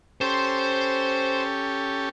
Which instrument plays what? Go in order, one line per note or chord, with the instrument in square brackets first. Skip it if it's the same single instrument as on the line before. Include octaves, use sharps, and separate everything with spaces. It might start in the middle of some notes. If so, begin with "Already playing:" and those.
[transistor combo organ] C#4 G4 A4 [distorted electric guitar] C5 C6